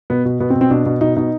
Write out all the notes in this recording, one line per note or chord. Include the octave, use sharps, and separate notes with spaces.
B2 B3
B2
B2 B3
C4
B2
C4
B2 D4
B2
B2 D#4
B2 D#4